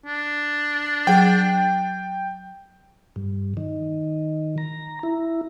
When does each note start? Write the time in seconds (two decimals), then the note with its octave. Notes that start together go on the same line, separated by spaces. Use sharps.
0.05 D4
1.07 F#3 G#4 G5
3.16 G2
3.57 D#3
4.58 A#5
5.03 E4